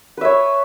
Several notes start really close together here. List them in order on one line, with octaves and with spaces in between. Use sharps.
B4 E5 C#5